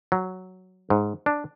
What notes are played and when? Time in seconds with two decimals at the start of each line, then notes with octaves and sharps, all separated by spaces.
0.12 F#3
0.90 G#2
1.26 D4